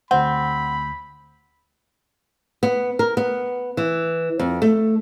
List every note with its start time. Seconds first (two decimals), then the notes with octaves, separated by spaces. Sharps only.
0.11 D2 C4 F#5 B5 G6
2.63 B3
2.99 A#4
3.17 B3
3.77 E3
4.39 F2
4.62 A3